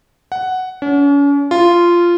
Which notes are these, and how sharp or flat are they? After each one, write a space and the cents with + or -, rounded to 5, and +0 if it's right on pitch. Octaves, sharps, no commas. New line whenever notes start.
F#5 +5
C#4 +40
F4 -10